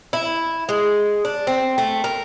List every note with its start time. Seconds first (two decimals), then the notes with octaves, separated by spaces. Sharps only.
0.13 E4
0.69 G#3
1.25 D4
1.47 C4
1.78 A3
2.04 A#4